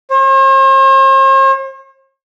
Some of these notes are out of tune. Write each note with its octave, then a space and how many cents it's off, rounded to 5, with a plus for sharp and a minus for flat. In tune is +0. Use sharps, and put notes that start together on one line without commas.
C5 +45